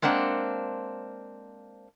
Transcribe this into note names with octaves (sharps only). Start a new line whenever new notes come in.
G#3 A#3 C4 D4 F#5